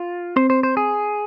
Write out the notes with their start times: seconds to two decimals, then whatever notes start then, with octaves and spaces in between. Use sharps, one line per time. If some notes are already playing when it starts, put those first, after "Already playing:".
Already playing: F4
0.36 C4 C5
0.50 C5
0.63 C5
0.77 G#4